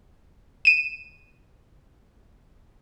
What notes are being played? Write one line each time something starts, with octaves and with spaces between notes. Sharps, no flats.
D#7 E7